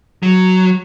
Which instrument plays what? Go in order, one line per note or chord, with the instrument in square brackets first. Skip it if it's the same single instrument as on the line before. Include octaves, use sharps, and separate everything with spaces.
[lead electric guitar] F#3